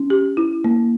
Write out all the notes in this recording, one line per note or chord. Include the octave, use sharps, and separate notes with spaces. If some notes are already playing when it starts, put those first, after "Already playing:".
Already playing: C#4
G4
E4
A#3